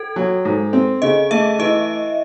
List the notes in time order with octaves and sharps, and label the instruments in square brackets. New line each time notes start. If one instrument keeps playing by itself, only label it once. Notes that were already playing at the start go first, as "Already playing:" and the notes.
Already playing: [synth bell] A4
[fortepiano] F#3
G#2
C4
[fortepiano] C#3 [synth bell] D#5
[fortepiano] A3 [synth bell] E5
[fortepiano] E3 [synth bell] D#5